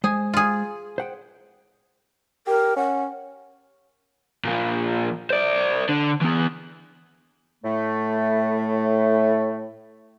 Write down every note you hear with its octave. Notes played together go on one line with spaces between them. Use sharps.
G#3 G#4 C5
F4 G#4
C5 F#5 G5
G4 A#4
C#4 F#5
A#2 F3
C5 D5
D3
E3 B3
A2 A3